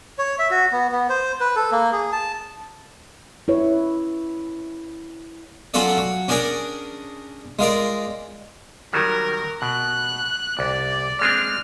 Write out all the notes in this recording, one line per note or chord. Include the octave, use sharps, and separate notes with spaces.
C#5
E5
F#4
B3
B3
C5
B4
A4
A#3
G#4
A5
E4 B4 C#5
F#3 C#4 F4 F#4 A4 D5
F#3
C#4 D4 G#4 A#4 D5
G#3 F4 A#4 D5
D#3 F#3 G3 A#4
B2 F#6
C2 D5
G#3 C4 D4 F6